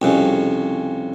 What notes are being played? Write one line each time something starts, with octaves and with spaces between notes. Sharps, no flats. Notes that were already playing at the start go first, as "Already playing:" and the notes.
C2 F2 C#3